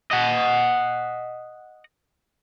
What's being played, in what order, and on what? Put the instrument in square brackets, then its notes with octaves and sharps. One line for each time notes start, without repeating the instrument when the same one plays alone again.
[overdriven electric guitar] D#5 F#5